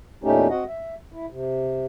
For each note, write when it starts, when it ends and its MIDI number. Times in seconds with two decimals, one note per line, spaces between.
0.24 0.47 40
0.24 0.47 46
0.24 0.47 57
0.24 0.47 61
0.24 0.47 63
0.24 0.47 67
0.50 0.64 60
0.50 0.64 66
0.50 0.64 75
0.50 0.64 78
0.68 0.95 76
1.12 1.26 64
1.30 1.86 48